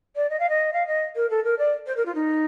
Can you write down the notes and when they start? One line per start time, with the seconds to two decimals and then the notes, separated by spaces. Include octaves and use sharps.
0.16 D5
0.29 D#5
0.39 F5
0.49 D#5
0.73 F5
0.87 D#5
1.15 A#4
1.30 A4
1.44 A#4
1.58 D5
1.86 C5
1.96 A#4
2.05 F4
2.14 D#4